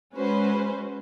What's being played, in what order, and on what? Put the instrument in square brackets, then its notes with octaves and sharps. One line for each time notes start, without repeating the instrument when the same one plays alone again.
[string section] G#3 C#4 F#4 B4 C5